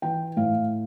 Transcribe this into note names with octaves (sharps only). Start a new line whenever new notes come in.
E3 G5
A2 F5